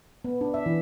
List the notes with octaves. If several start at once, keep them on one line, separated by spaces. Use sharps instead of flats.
B3
D4
E5
E3